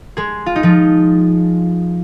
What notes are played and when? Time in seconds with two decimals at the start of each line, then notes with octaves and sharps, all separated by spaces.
0.17 G#3 G#4
0.46 F4
0.56 D#4
0.63 F3 F4